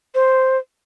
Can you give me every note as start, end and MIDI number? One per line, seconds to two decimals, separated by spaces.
0.15 0.58 72